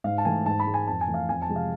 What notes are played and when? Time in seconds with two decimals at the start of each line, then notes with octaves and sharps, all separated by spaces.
0.04 G#2 F5
0.18 A5
0.25 E3 A3 G#5
0.46 G#2 A5
0.60 B5
0.66 G#3
0.74 G#5
0.87 F2 A5
1.01 G#5
1.07 E3 A3
1.14 F5
1.28 F2 G#5
1.42 A5
1.49 C3 F3 G#3
1.56 F5